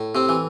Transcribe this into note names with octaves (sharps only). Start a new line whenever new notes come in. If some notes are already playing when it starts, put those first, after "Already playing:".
Already playing: A2
C3 C4
E3